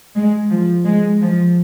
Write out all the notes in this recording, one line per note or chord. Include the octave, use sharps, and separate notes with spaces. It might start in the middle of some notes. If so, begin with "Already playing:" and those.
G#3
F3
G#3
F3